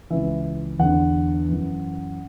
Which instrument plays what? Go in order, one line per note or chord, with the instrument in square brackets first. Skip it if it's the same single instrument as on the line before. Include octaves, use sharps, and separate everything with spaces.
[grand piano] C#2 C#3 E3 E5
E2 D3 F#5
F#2 E3